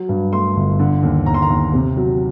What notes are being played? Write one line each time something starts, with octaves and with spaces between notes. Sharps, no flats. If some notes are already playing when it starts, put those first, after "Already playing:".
Already playing: F#3
G2
A3 C6
G1
D3
D#2
D#2 A#5
C6
A#5
D#2
C3
F#3